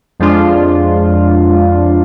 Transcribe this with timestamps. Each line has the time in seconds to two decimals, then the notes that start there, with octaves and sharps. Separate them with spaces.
0.19 F2 F3 G#3 D4 F4